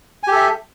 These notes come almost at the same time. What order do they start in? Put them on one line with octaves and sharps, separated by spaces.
G#5 G4 A4 E5